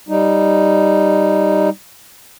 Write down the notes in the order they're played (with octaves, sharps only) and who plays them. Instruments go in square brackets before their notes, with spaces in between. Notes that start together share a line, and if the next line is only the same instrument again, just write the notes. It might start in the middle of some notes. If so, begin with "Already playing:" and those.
[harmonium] G3 D#4